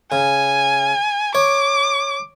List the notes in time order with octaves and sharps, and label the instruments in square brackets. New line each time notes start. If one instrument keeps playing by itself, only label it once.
[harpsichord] C#3 [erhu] G#5
[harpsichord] C#5 [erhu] D6